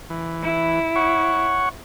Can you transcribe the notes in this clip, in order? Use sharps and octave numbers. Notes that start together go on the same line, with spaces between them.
E3
E4
C#5 F#5 C#6